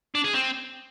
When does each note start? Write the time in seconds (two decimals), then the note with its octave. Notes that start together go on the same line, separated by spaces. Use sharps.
0.15 D4
0.24 G#4
0.34 C4